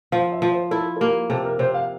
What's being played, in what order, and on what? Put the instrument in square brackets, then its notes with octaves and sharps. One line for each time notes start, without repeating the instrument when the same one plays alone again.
[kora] F3 [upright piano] F5
[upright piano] E5
[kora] F3
[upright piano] C5
[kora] E4 [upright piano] A4
[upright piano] A4
[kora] A#3 [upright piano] G4
[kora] C3 [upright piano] A4
[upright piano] A#4
[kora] C3 [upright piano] C5
[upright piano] F5